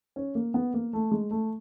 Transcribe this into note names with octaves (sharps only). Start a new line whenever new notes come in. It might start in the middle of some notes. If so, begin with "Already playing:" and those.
C#4
A#3
B3
A#3
A3
G#3
A3